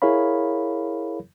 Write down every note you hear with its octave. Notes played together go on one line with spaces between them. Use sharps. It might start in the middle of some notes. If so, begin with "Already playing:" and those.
E4 G#4 A#4 C#5 F5 B5